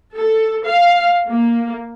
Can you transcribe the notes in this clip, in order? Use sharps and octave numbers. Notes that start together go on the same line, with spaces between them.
A4
F5
A#3